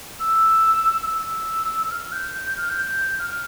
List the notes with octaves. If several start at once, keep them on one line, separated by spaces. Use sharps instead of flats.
E6
E6
F6
G6
G6
F6
G6
F6
F6